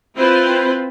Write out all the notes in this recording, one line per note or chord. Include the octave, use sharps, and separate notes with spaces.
C4 E4 F4 B4 C5